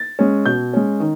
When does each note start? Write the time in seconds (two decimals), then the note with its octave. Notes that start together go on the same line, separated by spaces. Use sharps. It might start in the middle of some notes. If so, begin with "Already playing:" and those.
Already playing: A6
0.19 G#3 C#4
0.46 B2 G6
0.74 G#3 C#4
1.00 D#3